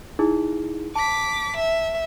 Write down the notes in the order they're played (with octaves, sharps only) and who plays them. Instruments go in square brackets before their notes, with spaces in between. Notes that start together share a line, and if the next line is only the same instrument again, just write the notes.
[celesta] D#4 E4 G#4
[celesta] A5 [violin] D6 B6
[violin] E5